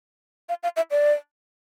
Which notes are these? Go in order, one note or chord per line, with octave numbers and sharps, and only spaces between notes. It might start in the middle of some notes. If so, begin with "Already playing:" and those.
F5
F5
E5
D5